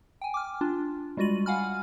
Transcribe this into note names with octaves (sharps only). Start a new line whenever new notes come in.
G5 G#5
D6 F6
D4 F4
G3 G#3 F4 F#4 D#7 F#7
F5 F#5 G#5 B5 F6